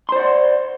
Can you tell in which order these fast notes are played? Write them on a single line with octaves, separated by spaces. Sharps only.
C6 C5 D5 F#5